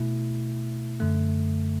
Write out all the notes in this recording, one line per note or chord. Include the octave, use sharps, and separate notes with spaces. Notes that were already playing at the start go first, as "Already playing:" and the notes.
Already playing: B2 A3 E4
F#2 D3 A3